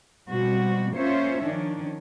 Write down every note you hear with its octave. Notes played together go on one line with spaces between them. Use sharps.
B2 F3 G3 C4 F#4
A#3 C#4 F4 C5 C#5 E5
D#3 F3 C#4 D4